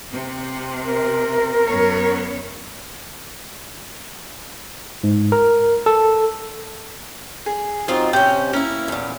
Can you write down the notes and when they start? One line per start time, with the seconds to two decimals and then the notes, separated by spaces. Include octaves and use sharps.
0.11 C3
0.85 A#4
1.66 F#2 B3 C#5
5.04 G#2
5.32 A#4
5.86 A4
7.46 G#4
7.88 F#2 C4 D#4 F4
8.13 C3 C#4 G5
8.53 A#3 C#4 E4
8.88 E2 A#2